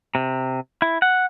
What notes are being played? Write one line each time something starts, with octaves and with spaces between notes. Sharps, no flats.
C3
E4
F#5